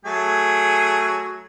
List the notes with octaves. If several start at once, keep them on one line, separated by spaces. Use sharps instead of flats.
F#3 A3 G#4